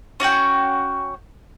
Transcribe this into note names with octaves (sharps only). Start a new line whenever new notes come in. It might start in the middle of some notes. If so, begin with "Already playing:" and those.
C#4 F#4 F#5 G5